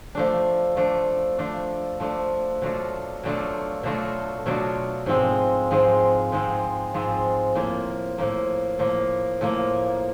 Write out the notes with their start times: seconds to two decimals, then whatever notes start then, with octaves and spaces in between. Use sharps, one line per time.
0.15 F3 A3 D4
0.77 F3 A3 D4
1.38 F3 A3 D4
2.00 F3 A3 D4
2.62 B2 F#3 A3 D4 F4
3.23 B2 F#3 A3 D4 F4
3.83 B2 F#3 A3 D4 F4
4.46 B2 F#3 A3 D4 F4
5.06 G#2 F3 G#3 C4
5.71 G#2 F3 G#3 C4
6.32 G#2 F3 G#3 C4
6.94 G#2 F3 G#3 C4
7.55 A2 F3 A#3
8.18 A2 F3 A#3
8.79 A2 F3 A#3
9.41 A2 F3 A#3